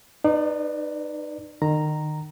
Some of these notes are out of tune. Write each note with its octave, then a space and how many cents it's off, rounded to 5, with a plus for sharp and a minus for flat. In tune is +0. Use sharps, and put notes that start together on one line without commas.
D#4 -30 B4 +0 D5 +5
D#3 -35 A#5 +0